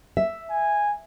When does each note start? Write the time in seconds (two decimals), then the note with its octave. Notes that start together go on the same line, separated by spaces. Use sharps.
0.17 E5
0.50 G#5